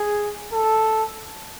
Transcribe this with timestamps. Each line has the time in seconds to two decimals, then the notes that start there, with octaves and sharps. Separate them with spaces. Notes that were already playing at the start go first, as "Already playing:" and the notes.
Already playing: G#4
0.53 A4